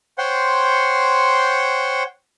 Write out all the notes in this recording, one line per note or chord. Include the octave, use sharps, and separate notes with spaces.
C5 C#5 F#5 G5 C6